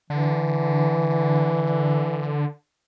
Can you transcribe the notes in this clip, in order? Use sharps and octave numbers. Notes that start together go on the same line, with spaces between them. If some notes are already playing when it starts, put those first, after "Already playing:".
D3 E3